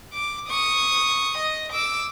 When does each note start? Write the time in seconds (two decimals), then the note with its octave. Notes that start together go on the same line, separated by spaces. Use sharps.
0.13 D6
0.48 C#6 D#6
1.37 D#5
1.72 D6 E6